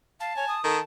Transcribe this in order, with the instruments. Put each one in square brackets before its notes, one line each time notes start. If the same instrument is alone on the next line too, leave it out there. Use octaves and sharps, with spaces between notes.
[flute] F5 [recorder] A5
[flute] C#5 [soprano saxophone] G#5
[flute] D#6
[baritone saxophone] D#3 [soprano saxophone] A4 [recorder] A5